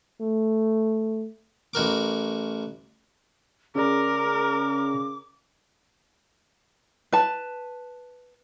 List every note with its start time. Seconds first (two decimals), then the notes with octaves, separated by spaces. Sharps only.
0.21 A3
1.74 A1 F#4 A#4 D6
3.76 C#3 C#4 G#4 A#4 D5 D6
7.12 B4 A5